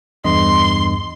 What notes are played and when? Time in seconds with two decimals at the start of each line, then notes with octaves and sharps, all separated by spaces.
0.24 E2 G2 D#5 C6